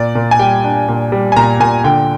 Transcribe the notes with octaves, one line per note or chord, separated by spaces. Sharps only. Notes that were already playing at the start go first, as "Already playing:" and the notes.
Already playing: A#2 D5
A#2
G#5
G3 G5
D4
A#2
G3
G#5
A#2 A#5
A#2 G#5
D3 G5